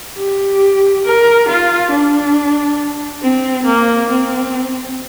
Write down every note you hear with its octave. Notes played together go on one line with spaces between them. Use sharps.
G4
A#4
F4
D4
C4
A#3
C4